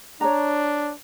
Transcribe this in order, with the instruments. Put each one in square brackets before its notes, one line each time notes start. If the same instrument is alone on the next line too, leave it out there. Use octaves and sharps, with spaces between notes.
[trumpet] D4 [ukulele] C#5 A#5